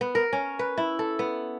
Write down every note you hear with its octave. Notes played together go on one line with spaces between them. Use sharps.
B3
A#4
C#4
B4
E4
A4
B3